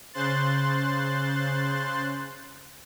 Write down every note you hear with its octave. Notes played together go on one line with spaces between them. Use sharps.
C#3 C5 C6 F#6 A6